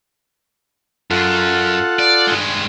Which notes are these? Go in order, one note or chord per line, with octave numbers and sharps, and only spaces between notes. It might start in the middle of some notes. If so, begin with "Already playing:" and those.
F#2 F4 A4 F#5
D5
G2 G#3